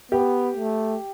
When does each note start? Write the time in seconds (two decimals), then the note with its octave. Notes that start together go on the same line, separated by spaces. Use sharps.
0.12 B3 G4
0.57 A3